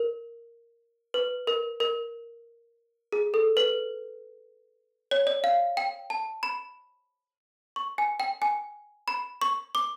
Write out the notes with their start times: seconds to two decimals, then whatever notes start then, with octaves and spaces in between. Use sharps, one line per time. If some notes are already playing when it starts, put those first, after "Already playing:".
Already playing: A#4
1.14 B4
1.47 A#4
1.80 A#4
3.12 G#4
3.34 A4
3.57 B4
5.11 C#5
5.27 D5
5.44 F5
5.77 G5
6.10 A5
6.43 B5
7.76 C#6
7.98 G#5
8.20 G5
8.42 G#5
9.08 B5
9.41 C#6
9.75 D6